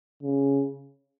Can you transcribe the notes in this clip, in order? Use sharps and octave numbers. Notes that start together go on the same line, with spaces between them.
C#3